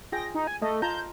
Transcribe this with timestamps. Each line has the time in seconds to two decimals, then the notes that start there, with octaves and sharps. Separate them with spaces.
0.12 F4 G#4 G5 A#6
0.34 D#4
0.47 G#5
0.62 A3 A4 D#5
0.82 F4 A5 A#5 G6